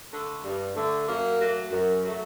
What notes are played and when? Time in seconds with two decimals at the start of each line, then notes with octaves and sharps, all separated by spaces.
0.11 D3 A3
0.44 G2
0.76 D3 A3
1.07 F#2 A#3
1.40 F#3 A3
1.72 F#2
2.03 F#3 A3